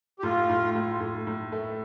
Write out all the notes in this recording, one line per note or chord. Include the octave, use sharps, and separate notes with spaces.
G4
A2 F4
A2
A2
A2
A2
A3